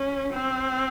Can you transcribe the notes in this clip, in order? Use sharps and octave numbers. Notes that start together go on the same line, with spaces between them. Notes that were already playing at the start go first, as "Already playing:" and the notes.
Already playing: C#4
C4